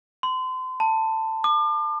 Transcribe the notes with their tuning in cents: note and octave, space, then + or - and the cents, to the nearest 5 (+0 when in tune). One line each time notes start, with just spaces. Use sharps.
C6 -35
A5 +15
D6 +40